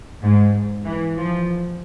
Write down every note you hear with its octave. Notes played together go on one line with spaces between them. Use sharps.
G#2
E3
F3